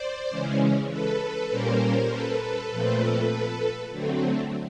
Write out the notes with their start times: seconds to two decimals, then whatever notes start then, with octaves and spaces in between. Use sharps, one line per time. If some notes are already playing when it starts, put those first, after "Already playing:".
Already playing: C5 D5
0.30 C#3 E3 G#3 C#4
0.90 A4 B4
1.50 A#2 G3 A#3 C#4 A#4 C5
2.10 A4 B4
2.40 A4 B4
2.71 A#2 F3 A3 C4
3.91 D3 F#3 A3 C4